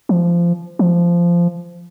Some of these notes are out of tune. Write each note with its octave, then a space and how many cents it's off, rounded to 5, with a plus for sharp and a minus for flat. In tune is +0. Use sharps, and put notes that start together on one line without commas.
F3 -20
F3 -15